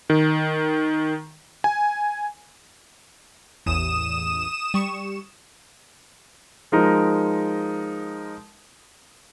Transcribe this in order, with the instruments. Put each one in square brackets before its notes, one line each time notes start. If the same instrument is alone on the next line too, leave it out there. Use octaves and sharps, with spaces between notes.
[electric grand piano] D#3
G#5
[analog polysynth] A1 E2 [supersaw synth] D#6 E7
[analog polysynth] G3 C#6 E7
[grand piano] F3 G#3 D#4 A#4